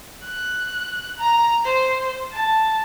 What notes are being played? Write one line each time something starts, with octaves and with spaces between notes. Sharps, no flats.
F#6
A#5
C5
A5